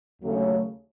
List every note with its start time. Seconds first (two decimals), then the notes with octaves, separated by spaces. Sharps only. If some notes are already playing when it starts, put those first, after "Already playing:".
0.21 D#2 C#3 F#3 A3 C#4